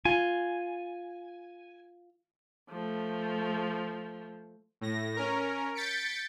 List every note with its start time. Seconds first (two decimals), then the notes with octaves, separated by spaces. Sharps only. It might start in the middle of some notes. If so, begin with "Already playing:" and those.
0.05 F4 G#5
2.70 F3 A3
4.81 A2 A#6
5.16 C#4 A#4
5.75 G6 A6 B6 C#7 D7